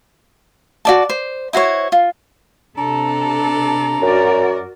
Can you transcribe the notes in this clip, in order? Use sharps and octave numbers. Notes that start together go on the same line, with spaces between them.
F#4 D5 A5
C5
E4 F#4 C5 C#5
F4
C3 D4 A4 A#5
F#2 F#4 A#4 D5